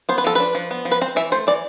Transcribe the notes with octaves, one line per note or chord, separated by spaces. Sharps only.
B3 C5
B4
F3 A4
D4 B4
F3
B3
F3
B4
C4 C5
E3 E5
A3 C5
E3 D5